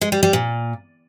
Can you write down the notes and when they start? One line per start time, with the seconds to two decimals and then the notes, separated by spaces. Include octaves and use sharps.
0.01 G#3
0.12 G3
0.23 G3
0.33 A#2